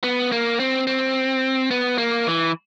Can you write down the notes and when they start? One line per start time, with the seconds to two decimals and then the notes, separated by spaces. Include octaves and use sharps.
0.04 B3
0.32 A#3
0.60 C4
0.87 C4
1.71 B3
1.98 A#3
2.27 E3